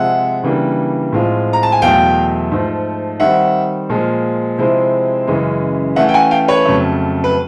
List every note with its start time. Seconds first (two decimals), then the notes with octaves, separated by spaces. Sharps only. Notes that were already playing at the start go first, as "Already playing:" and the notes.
Already playing: C3 F3 G#3 E5 F#5
0.43 C#3 E3 G3 A#3 D4
1.12 A2 F3 G#3 C4 F4
1.53 A#5
1.63 A5
1.72 G#5
1.82 E2 B2 F#3 A3 F5 G5
2.51 G#2 F3 A3
3.20 D#3 G3 C4 E5 F#5
3.89 A#2 F3 G#3
4.58 C3 F3 G#3 C4 E4
5.27 F#2 C#3 E3 G#3
5.96 E3 A3 C#4 E5 F#5
6.09 G5
6.14 F#5 G#5
6.31 F5 G5
6.48 B4 C#5
6.65 F2 C#3 F#3 A3
7.24 B4